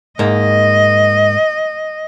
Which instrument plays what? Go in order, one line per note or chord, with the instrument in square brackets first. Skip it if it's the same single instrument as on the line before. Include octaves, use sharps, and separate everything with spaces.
[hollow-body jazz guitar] G#2 A#3 [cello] D#5